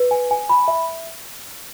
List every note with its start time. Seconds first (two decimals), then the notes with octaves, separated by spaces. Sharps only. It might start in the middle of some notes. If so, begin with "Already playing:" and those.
Already playing: B4
0.11 G#5
0.31 G#5
0.49 B5
0.68 E5